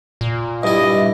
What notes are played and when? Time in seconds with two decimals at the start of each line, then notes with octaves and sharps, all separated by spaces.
0.21 A#2
0.63 G2 E4 D#5 E5